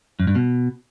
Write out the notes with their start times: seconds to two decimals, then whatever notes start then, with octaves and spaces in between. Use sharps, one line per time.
0.20 F#2
0.27 G2
0.35 B2